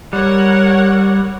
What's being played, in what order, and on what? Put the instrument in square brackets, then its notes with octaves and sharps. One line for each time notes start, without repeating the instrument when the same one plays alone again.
[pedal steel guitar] G3 [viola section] A#4 C#5 F#5